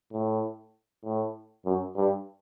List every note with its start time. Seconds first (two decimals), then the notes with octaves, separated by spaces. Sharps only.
0.13 A2
1.05 A2
1.66 F#2
1.96 G2